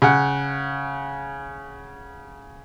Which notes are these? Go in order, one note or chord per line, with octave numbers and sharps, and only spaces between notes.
C#3 F#5